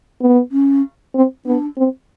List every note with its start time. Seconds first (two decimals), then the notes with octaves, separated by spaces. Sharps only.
0.21 B3
0.52 C#4
1.15 C4
1.46 B3 D4
1.77 C4